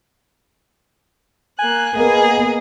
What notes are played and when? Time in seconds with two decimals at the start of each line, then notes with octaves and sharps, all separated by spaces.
1.59 A#3 G#5 F#6
1.94 A#3 B3 G#4 D#5